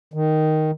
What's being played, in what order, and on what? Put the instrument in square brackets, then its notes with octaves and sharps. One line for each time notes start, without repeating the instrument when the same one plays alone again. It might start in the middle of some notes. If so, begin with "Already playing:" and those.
[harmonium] D#3